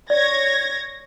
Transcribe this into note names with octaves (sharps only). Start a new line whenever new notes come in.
C#5 D5 G#6 A#6